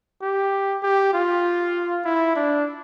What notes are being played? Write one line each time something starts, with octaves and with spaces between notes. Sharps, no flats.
G4
G4
F4
E4
D4